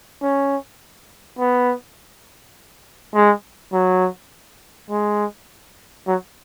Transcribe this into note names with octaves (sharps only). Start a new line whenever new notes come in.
C#4
B3
G#3
F#3
G#3
F#3